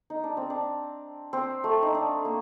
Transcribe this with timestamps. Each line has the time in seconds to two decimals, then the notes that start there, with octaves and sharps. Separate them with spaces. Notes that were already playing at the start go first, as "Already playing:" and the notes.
0.10 D#4
0.24 D4
0.37 C4
0.50 D4
1.33 C4
1.64 A3
1.82 D#4
1.94 D4
2.25 A#3